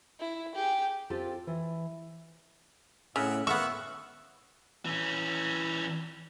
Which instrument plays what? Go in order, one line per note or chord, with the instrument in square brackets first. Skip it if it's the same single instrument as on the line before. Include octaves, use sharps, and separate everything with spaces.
[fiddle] E4
G4 G#4
[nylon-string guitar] C4 F4 G4 A4
E3
[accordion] A2 [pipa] C#3 [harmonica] E5 F#5
[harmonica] A#3 F#5 F6 [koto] B3 E5 [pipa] C#6 [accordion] E6
[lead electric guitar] E3 C#4